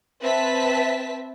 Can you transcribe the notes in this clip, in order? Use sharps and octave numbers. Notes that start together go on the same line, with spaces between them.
C4 B4 E5 A5 B6